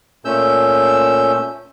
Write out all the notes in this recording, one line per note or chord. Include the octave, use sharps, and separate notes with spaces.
A#2 A3 C#4 E6 G6